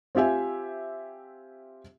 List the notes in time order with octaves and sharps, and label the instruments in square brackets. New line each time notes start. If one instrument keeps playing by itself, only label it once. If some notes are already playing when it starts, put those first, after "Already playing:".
[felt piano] C4 F4 G4 E5 G#5